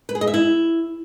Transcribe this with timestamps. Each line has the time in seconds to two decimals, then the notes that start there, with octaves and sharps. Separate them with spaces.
0.09 B4
0.15 G#4
0.21 D#5
0.27 E5
0.34 E4